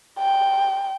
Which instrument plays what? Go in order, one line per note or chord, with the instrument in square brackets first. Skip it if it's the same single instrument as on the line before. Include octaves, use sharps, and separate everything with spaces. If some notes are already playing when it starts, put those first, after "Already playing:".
[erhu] G5